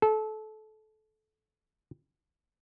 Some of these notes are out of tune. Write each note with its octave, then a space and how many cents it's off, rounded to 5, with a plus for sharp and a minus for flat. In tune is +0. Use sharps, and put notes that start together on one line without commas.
A4 -25